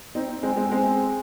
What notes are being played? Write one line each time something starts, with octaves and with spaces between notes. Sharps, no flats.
C4 D#4
G#3 C4
G#3 C4
G#3 C4